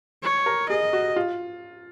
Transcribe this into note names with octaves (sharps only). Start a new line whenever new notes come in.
C#5
A#4
G#4 D#5
F#4
F4